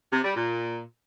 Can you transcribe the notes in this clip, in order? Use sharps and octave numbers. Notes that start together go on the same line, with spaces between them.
C3
G3
A#2